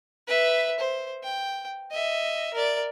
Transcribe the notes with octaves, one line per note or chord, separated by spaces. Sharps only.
B4 E5
C5
G5
D#5 E5
A#4 D5